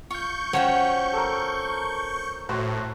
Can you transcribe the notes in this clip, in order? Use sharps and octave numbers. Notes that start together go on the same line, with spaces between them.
F4 C#6 G6
F3 C#4 F#4 C#5 F#5 G5
A4 A#4
A2 F#4 C5